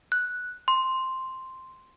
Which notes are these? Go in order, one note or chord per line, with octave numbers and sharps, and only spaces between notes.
F#6
C6